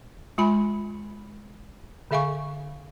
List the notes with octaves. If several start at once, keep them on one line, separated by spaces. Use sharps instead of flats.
G#3 F4 G#5 B5
D3 G#4 E5 F5 G#5 C#6